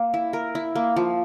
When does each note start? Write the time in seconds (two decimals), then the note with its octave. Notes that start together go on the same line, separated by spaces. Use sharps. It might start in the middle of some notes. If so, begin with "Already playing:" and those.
Already playing: A#3
0.14 E4
0.33 A#4
0.55 E4
0.75 A#3
0.96 F3